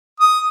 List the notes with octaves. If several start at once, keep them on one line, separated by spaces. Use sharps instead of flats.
D#6